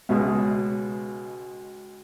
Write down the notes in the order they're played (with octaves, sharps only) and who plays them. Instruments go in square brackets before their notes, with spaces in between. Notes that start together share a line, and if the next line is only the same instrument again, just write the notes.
[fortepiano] C#2 B2 G#3 G#4 D#6